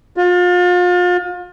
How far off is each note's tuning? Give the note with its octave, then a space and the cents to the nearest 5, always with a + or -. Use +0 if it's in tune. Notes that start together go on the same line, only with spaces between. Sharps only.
F4 +35